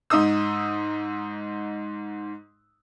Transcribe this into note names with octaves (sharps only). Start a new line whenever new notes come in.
G#2 D#4 D#6 E6